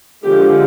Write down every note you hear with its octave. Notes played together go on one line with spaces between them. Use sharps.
D3 F3 G#3 G4